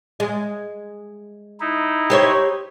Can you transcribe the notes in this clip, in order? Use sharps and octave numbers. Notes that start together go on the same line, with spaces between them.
G#3
D#4 E4
G4 C5 C#5